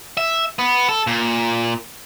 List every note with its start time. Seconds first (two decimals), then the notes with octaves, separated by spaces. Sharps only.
0.17 E5
0.59 B3
0.89 A4
1.07 A#2